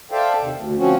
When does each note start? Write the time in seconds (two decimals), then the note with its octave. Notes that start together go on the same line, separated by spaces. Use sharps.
0.11 A4 C5 D5 E5 F5 G5
0.41 D#2 C3 D#3
0.55 D2
0.77 F3 C4 C#4 F#4